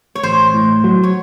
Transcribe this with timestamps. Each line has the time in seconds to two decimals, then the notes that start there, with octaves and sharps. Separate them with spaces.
0.15 C#5
0.23 A1 C5
0.54 A2
0.84 F#3
1.03 C#5